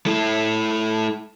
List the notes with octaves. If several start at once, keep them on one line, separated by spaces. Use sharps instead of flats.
A3 E4